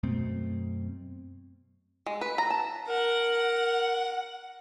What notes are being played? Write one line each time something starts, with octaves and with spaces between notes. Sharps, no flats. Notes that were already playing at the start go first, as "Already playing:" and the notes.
F#2 B2 A3 C4
G#3
B4
A#5
A5
A#4 F#5